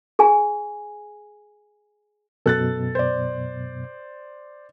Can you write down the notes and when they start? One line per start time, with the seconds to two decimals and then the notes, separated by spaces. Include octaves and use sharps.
0.19 G#4 G#5
2.46 F#2 B2 A4 F#6 A6
2.95 C5 D5